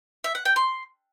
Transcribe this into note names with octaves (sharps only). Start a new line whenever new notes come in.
E5
F#5
G5
C6